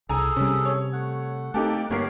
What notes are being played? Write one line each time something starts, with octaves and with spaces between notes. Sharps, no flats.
C2 G#4 A4 G#5 A#5
C3 G3 C#4
C#5
A3 F#5
A3 A#3 C4 D#4 G4 A4 D6 F#6
G1 G2 A#3 G4 A#4 C#5 C7